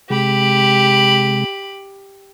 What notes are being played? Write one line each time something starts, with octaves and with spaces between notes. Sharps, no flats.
C3 G#3 G4 B5